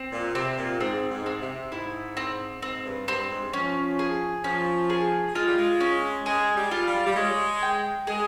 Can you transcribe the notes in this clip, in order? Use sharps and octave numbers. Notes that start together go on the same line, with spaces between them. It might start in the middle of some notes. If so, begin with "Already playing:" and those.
Already playing: C4
A#2
C3 C4
A#2
G#2 C4
G#2
C4
C3
G#2 E4
C4
G#2 C4
G2
G2 C4
G#2
F3 C#4
G#4
F3 C#4
G#4
G#3 F4
G3
G#3
C#4
G#3 G#4
G3
F4
G3
G3
G#3 C#5
G5
G#3 G#4